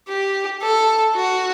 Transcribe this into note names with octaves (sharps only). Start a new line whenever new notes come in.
G4
A4
F#4